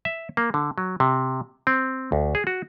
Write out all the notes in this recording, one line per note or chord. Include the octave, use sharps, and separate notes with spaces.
E5
A#3
D3
F#3
C3
C4
D2
G#4
F#4